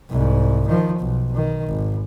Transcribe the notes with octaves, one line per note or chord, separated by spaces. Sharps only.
C2 G#2
D#3 F3
B1
D#3
G#1